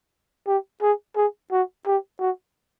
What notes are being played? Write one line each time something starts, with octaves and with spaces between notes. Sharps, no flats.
G4
G#4
G#4
F#4
G4
F#4